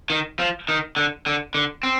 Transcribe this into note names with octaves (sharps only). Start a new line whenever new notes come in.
D#3
F3
D#3
D3
D3
D3
C4